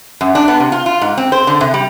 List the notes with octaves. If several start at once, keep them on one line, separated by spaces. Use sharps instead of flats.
F#2
D4
B3
C3
F4
F4
G#2
C4
C5
D3
C3
G3